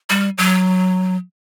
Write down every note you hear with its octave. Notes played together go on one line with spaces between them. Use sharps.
G3
F#3